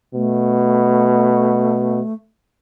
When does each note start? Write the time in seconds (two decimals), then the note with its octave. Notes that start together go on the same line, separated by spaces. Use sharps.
0.14 B2 A3